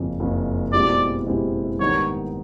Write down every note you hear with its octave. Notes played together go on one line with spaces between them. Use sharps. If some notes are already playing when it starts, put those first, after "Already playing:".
Already playing: F#1 F2 C#3
F#1 F2 C#3
B2 G#3 C4 E4 G4 D5
B2 G#3 C4 E4 G4
G#2 D#3 G3 B3 D#4 C#5